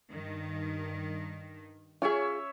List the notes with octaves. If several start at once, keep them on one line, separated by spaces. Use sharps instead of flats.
G2 D#3
C#4 F4 G#4 C#5 E5